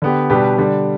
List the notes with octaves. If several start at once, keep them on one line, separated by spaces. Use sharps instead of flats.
D3 B3 G4
B2 G3 D4 G4 B4
D3 G3 D4